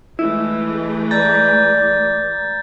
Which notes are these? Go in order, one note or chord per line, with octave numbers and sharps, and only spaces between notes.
E3 G#3 A3 E4
D5 A#5 G6 A6